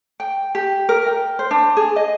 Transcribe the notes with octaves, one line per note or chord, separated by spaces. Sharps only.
G5
G4
A#4
G5
C5
D4
G#4
D#5